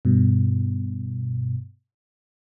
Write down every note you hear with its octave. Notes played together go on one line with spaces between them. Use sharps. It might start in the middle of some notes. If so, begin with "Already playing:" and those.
G2 B2